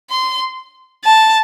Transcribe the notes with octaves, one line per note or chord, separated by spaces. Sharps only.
C6
A5